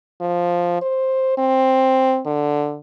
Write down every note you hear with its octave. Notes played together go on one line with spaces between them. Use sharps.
F3
C5
C4
D3